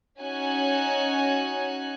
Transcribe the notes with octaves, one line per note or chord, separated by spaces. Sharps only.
C#4 D#4 F#4 G#5 F#6